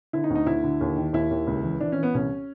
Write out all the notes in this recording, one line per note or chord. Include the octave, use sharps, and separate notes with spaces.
D3 E4
D#4
D2
D#4
D2 E4
D3
D#2
D#3
D#2 E4
D#2
C#2
E3
E3 D4
C#4
E3
B3
C2 C#4